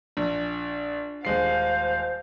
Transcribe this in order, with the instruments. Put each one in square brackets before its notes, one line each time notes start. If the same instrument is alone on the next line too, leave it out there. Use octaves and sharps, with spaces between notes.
[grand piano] A#1 [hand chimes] D4
[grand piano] D#1 G#3 C7 [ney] C5 [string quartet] F5